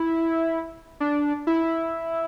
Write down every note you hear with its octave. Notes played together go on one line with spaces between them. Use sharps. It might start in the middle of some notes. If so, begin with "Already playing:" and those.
Already playing: E4
D4
E4